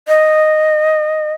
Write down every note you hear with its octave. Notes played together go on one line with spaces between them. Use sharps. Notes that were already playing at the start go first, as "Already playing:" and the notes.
D#5